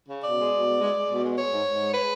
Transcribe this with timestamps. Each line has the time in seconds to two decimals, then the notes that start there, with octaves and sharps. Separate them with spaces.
0.09 C#3
0.22 B2 D5
0.37 G#3
0.51 B2
0.66 G#3
0.80 G#3
0.95 G#3
1.09 B2
1.23 G#3
1.36 G#3 C#5
1.52 G#2
1.66 G#2
1.79 G#3
1.94 G#3 B4